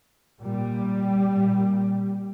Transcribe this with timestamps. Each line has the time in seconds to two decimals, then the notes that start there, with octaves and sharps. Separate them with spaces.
0.41 A#2 G3
1.32 A#2